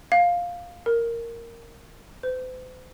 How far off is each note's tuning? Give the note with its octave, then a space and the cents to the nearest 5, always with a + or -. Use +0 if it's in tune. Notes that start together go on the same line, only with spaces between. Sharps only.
F5 +5
A#4 -10
C5 -45